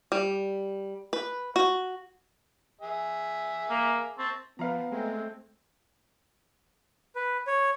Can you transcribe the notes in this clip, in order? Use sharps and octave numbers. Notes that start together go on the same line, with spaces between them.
G3
B4
F#4
G#4 E5
A#3
C4 A5 C#6
F3 B3 B4 F5 A#5
G#3 A3 C4
B4
C#5